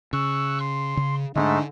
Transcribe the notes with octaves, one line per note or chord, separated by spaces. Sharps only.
C#3 C#6 E6 F#6
C6
C#3
G#2 D3 G#3 A3 C4 D4